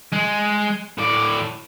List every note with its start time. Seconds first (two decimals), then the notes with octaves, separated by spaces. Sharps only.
0.12 G#3
0.98 A2 D5